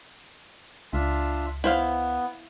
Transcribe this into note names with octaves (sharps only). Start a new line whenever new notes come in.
C#2 D4 F4 E5
B3 E4 C5 F5